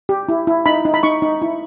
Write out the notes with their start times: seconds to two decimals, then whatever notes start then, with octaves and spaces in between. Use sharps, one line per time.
0.09 G4
0.29 E4
0.47 E4
0.66 D#4 B5
0.85 D#4
0.94 B5
1.03 D#4 C#6
1.22 D#4
1.42 E4